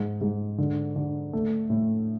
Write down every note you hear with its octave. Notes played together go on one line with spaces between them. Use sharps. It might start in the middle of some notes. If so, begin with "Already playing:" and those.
Already playing: G#2
G#2
D3
D3
A3
A2